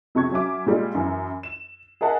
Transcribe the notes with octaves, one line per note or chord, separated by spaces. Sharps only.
F2 C3 C#6 G#6
F#3 C#4 E5 D6
A#2 G3 G#3
F#2 E3
E7
G#4 A#4 D#5 E5 F#5 A5